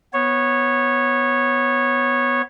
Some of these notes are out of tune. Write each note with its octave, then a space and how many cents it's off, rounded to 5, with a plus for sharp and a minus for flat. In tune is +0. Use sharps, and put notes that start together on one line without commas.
B3 +0 C#5 -15